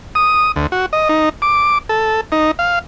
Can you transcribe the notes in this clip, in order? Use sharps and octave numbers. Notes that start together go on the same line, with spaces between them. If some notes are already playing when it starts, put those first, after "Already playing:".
D#6
D2
F#4
D#5
D#4
D6
A4
D#4
F5